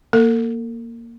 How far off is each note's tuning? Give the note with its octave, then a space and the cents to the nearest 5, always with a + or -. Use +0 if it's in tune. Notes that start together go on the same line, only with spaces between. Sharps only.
A#3 +0 A4 +45